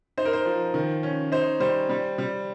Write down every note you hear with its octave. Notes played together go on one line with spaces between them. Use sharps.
D#4 C5
A#4
C5
F3
D#3
C#4
D#4 C5
G3 C5
G3
G3